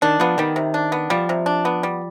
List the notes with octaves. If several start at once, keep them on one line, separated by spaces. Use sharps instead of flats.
D#3 D4
F3 B3
D#3 G3
C3
D4
B3
F3 G3
C3
D4
B3
G3